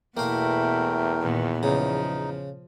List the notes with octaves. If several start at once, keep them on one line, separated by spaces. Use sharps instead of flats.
E2 B2 A3 A#3 E4 A#4 F5 G5
A#2 D#3 B3
C#3 F3 D#4